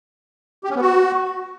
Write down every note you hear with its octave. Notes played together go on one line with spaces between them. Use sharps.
G4
C#4
B3
F#4